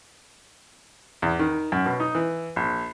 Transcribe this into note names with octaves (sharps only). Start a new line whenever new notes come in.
E2
D#3
F#2
B2
D#4
E3
A#1